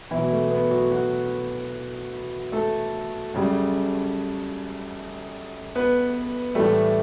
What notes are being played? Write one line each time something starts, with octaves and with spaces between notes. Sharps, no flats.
E2 B2 E3 F#3 E4
A3
B3
F#3 F#4
F#3 F#4
A3 A4
F#2 C#3 G3
B3 B4
A2 E3 G3 A3 A4